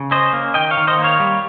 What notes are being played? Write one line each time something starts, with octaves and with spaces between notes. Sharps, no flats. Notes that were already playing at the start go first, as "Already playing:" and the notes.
Already playing: C#3
C#4 C5 D#5
A#3
D#3 D#5 G5
C#5 F5
D#3
C5 D#5
A#3
C#5 F5
G3